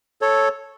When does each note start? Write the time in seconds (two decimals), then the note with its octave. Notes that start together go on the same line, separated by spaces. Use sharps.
0.21 A4 C#5